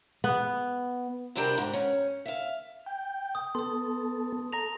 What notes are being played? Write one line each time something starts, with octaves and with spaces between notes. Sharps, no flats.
B3
C3 G3 D4 E4 G4 A#4
G#2
C#4
E5 F5
G5
D#6
B3 A4 C6 D#6
A4 A#5 A#6 F7